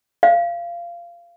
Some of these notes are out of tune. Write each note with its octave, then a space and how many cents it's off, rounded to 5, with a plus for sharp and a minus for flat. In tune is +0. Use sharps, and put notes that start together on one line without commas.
F5 -20